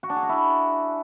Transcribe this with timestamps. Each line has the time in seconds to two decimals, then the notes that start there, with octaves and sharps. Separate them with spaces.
0.03 F#4
0.10 D4
0.16 G#4
0.23 F#4
0.29 E4